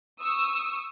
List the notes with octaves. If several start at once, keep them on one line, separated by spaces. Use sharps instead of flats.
C#6 D#6 E6